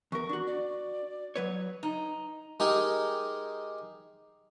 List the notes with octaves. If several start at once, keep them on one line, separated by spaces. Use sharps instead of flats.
E2 A#4 C#6
D4 F#4
D5
F#3 B4 C#5
D#4
G#3 D#4 G4 G#4 A#4